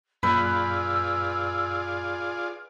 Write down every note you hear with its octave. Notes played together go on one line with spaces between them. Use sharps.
F#2 A#2 F4 G#4 B4 D5 E6 G6